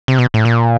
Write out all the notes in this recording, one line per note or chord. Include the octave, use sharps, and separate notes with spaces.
C3
B2
A2
A#2